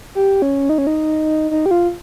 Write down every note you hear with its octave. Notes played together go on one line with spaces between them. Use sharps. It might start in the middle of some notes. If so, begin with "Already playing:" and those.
G4
C#4
D#4
C#4
D#4
D#4
G4
F4